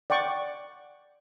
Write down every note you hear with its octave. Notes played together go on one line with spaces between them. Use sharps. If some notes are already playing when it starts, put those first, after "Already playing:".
D5 F#5 G5 C#6